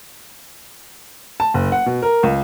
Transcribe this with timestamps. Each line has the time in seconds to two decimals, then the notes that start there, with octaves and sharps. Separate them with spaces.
1.40 A5
1.54 F#1
1.72 F#5
1.86 B2
2.02 A#4
2.23 C#2